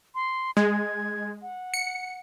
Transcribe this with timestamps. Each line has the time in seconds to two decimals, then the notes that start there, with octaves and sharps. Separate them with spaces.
0.15 C6
0.57 G#3 G#6
1.42 F#5
1.74 C#7